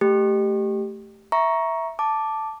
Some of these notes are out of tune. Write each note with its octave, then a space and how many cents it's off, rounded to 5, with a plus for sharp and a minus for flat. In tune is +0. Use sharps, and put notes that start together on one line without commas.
A3 +0 G4 +0
E5 +0 A#5 +15 C#6 +0
A5 +0 D6 +0